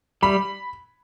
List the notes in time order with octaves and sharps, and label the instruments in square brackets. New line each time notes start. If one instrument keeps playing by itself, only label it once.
[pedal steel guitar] G3 [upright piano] B5